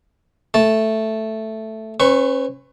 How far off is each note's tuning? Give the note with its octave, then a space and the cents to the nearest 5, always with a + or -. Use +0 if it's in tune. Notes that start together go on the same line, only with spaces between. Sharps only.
A3 +0 A5 +0
C#4 -30 B4 +30 C#6 +0